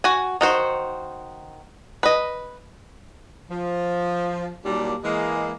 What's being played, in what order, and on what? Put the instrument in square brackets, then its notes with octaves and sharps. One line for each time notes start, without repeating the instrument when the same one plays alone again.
[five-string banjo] F#4 G#5
D#3 F#4 C5
B4 D#5
[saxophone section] F3
D#2 A#2 F#3 G3 A#3 D4
E3 G#3 A#3